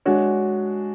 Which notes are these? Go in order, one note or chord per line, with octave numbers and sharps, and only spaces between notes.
G#3 D4 F#4 C#5